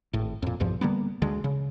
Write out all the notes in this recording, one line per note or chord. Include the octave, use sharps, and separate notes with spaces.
G#1 A2
F2 A#2
B1 E2 G2 F3
D3 G3 A#3 B3
D2 D3 G#3
C#3